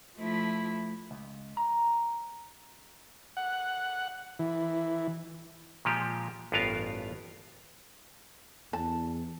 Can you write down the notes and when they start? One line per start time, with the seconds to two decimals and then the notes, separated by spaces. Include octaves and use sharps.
0.17 F3 A3 E4
1.11 C#2
1.57 A#5
3.37 F#5
4.39 E3
5.85 A#2 F3 G#3 G4
6.52 A1 G2 B3 F4 A#4 F5
8.73 E2 A5